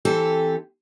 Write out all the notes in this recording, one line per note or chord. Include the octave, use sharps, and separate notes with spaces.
E3 C4 G4 A4